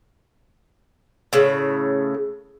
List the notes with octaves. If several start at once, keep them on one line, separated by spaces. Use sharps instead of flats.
A2 C#3